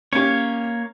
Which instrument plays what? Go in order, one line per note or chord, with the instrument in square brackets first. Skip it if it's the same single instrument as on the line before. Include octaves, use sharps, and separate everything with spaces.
[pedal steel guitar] A#3 C#5 [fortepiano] C#4 G4